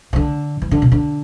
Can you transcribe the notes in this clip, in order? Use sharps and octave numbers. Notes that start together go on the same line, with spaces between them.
E3
D3
E3
D3
B2
D3